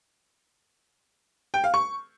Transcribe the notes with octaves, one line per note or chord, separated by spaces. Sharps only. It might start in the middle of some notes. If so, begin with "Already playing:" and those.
G5
F5
C#6